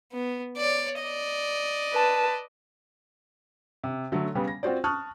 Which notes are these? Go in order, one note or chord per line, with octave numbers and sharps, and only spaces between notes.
B3
C#5 D5
D5 D#5
B4 A5
C3
D3 F#3 A3
C#3 G3 B3
A#6
C4 F4 F#4 C5 D5
A5 C#6 D#6 F6 F#6